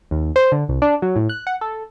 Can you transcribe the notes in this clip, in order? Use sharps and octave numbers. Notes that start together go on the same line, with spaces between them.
D#2
C5
D3
C2
D4
F#3
A2
F#6
F#5
A4